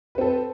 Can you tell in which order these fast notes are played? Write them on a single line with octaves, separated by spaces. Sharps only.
B4 C4 A4